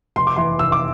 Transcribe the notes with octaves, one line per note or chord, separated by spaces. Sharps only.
F1 C6
D6
E3 C6
F1 E6
D6